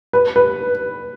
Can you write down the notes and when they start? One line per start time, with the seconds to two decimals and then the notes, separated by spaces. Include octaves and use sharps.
0.13 B4
0.36 B4